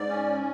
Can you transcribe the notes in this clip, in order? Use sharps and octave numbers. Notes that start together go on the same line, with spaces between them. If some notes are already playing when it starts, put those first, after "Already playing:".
Already playing: G#2 D5
C#4